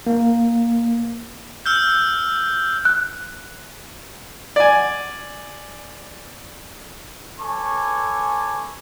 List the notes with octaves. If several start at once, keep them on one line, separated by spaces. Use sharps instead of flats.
A#3
E6 F6 G6
F#6
D5 G#5
A4 B4 C#5 G#5 C#6 D6